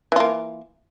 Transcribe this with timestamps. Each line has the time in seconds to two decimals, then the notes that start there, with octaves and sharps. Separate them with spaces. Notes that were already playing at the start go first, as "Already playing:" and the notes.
0.12 E3
0.16 F4
0.20 A#3